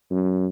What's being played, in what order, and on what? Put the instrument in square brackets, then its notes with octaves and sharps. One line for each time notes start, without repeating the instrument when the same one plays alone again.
[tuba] F#2